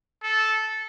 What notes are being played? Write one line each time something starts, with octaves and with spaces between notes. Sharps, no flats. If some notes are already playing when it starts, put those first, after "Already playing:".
A4